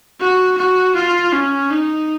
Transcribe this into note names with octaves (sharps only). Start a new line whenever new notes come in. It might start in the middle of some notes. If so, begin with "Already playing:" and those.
F#4
F#4
F4
C#4
D#4